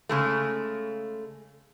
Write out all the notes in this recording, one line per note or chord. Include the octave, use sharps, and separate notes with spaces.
C#3 G#3 A3